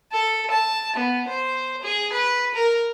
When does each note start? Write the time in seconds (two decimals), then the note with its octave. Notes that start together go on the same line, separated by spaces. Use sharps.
0.12 A4
0.51 A5
0.96 B3
1.28 C5
1.83 G#4
2.12 B4
2.54 A#4